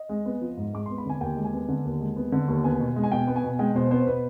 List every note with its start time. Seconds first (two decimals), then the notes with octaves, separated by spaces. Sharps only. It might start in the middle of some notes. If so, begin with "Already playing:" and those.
Already playing: D#5
0.09 G#3
0.25 B3
0.41 F3
0.57 G#2
0.74 G#3 D6
0.86 B3 C6
0.98 B5
1.06 D3 G#5
1.21 D#2 G5
1.37 G#3
1.45 G#5
1.53 B3
1.68 D3
1.85 D#2
2.00 G#3
2.16 B3
2.32 D3
2.48 D#2
2.64 B3 G#5
2.80 B2
2.96 G#3
3.03 G#5
3.11 B2 G5
3.27 B3
3.36 G#5
3.44 B2
3.59 G#3 G5
3.75 B2 C5
3.91 B3 C5
4.07 B2 B4